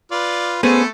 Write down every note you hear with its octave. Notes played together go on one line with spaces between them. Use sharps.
F4 B4 D5
A3 B3 C#4 G#4 A4 C5